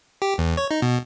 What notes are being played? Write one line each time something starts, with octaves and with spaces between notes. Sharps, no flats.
G4
E2
C#5
D#4
B2